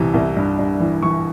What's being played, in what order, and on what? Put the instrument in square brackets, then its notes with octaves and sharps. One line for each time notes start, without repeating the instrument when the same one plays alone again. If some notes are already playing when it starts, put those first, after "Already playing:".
Already playing: [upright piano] C2 C3 E3
C2
G2
G2
E3
E3 C#6